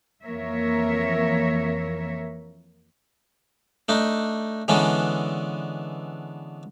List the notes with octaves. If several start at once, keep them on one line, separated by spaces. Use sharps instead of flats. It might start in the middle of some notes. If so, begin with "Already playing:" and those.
F2 E3 A#3 A#4 C#5 E5
A3 D4 D#4
D3 E3 G#3 B3 C#4 D4